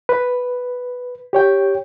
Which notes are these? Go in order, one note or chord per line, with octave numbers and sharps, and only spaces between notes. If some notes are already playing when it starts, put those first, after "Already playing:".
B4
G4 C#5 G5